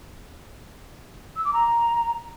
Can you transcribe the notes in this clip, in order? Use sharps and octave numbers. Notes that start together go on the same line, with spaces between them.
E6
D6
A#5